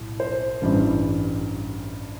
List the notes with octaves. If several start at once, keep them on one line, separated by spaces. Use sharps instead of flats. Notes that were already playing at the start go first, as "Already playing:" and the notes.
Already playing: B1 A2
C5
A1 G2 E3